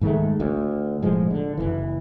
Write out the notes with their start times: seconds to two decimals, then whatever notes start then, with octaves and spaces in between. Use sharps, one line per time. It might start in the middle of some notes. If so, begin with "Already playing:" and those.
0.01 G#2 D#3 G#3 A3
0.40 D2
1.02 E1 A2 F3 G#3
1.31 D3
1.57 F#1 C2 E3